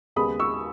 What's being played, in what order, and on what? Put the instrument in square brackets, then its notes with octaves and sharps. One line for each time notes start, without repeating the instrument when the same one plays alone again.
[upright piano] D#2 C#3 G#3 B3 B5 D#6
C#6 E6